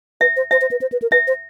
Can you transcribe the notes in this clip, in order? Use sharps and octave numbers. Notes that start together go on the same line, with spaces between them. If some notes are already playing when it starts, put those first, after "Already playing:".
B4 E5
C5
C5 E5
C5
B4
C5
B4
A#4
B4 E5
C5